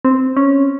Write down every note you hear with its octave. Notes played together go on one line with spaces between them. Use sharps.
C4
C#4